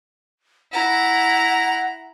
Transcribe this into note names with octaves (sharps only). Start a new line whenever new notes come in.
E4 F#5 A#5